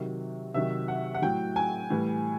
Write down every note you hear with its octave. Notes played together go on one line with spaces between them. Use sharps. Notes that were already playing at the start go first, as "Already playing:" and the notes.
Already playing: C3 D#3 F#3
C3 D#3 F#3 E5
F#5
F#5
A2 F#3 G5
G#5
A2 E3 G3